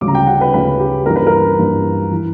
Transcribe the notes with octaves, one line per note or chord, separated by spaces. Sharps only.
D2 C#3 G3 D6
A#5
G5
F#5
B4
D2 C#3 G3 B4
G4
G2 E3 A#3 A#4
B4
A#4
G2 E3 A#3
E3